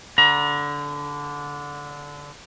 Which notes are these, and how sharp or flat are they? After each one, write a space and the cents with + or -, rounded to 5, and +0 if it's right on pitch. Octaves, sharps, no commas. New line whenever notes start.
D3 -15 A#5 +30